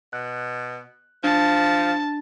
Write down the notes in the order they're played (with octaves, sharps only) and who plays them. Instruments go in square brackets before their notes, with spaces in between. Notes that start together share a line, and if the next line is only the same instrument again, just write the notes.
[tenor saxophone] B2 [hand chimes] F#6
[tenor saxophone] F3 [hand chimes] D4 [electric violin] A5